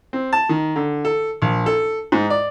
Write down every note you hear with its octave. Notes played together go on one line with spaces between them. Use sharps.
C4
A5
D#3
D3
A4
A#1
A4
G#2
D5